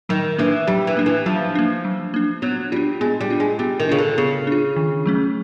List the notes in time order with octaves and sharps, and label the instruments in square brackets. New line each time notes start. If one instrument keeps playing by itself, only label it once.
[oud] D#3 [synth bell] F#3
[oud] E3 [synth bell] A#3 D4
[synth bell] F#3 [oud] G3
[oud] E3
[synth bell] A#3 D4
[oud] E3
[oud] F3 [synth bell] F#3
[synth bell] A#3 D4
F#3
A#3 D4
[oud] F#3 [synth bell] B3
[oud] G3 [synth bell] D4 F4
[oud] G#3 [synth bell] B3
[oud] G3
[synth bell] D4 F4
[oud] G#3
[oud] G3 [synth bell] B3
[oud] D#3
[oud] C#3 [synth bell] D4 F4
[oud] D3
[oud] C#3 [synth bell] B3
[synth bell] D4 F4
D#3
F#3 A3 C#4